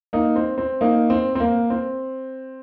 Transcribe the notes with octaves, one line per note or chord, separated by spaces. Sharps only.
A#3 D#4
C4
C4
A#3 D#4
C4
C4
A#3
C4